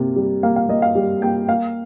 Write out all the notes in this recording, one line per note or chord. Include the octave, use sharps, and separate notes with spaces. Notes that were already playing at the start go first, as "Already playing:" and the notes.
Already playing: C3 A#3
G3
A#3 F5
F5
A#3 D#5
F5
G3
A#3 G5
A#3 F5